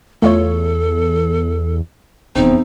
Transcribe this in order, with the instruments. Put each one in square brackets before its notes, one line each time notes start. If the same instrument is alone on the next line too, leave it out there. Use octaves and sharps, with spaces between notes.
[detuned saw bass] E2 [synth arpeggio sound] A3 F4 C#5 [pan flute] A4
[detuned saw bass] F1 [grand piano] E2 C4 [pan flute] D#4